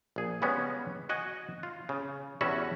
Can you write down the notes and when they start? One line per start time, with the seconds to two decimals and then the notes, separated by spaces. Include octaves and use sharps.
0.16 A#1 G#4
0.42 C#3 G3 G#3 B3 C#4
1.09 F#4 D#5 F#5 G#5
1.63 F4
1.89 C#3
2.41 E2 G3 C#4 F#4 E5 F#5